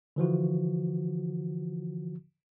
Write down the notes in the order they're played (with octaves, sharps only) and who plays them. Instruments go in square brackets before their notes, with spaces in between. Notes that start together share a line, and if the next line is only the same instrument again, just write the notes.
[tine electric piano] D3 E3 F3 F#4